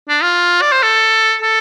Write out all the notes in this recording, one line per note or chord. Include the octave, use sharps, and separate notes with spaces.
D4
F4
D5
C5
A4
A4